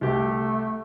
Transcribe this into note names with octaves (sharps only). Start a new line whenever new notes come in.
C2 A3 G4